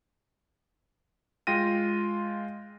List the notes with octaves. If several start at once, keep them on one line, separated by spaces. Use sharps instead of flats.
G#3 F4 G5 A#6 D#7